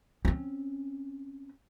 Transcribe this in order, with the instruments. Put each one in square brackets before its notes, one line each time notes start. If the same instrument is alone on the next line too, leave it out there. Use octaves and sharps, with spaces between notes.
[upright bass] C4 C#4